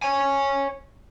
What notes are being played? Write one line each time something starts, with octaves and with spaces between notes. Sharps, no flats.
C#5 G#5